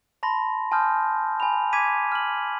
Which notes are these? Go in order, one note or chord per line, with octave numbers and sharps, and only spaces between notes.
A5 B5 C6 A#6
G#5 A5 C6 D#6 F6 G6
G#5 A5 B5 F7
G#5 D6 G#6 B6 D#7
F6 F#7